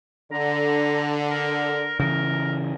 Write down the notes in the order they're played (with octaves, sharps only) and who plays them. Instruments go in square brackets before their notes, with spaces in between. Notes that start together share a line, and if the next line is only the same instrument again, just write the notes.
[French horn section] D3 [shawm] A#5
[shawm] A#4
[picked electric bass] C#3 E3 [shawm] A#4